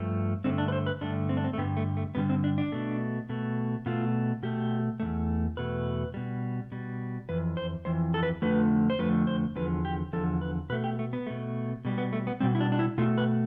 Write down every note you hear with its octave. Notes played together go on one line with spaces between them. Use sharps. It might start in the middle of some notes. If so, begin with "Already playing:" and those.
Already playing: G2 F3 A3
G2 D3 A3 C4
D4
B4
C5
B4
G2 D3 A3 D4
C4
D4
C4
A3
G2 D3 G3 B3
A3
A3
G2 D3 G3 B3
C4
D4
D4
B2 A3
B2 A3
B2 A3 F4
B2 A3 G4
E2 B2 A3
E2 B2 A3 B4
B2 G3
B2 G3
F2 E3 B4
C5
F2 E3 C5
A4
B4
F2 D3 F3 A3 B4
C5
F2 D3 F3 A3 B4
C5
E2 D3 F3 B4
G4
E2 D3 F3 A4
B4
B2 A3 B4
G4
A3
B3
B2 A3
B2 G3
B3
A3
B3
B2 G3 C4
E4
D4
D4
E4
B2 A3 F4
B4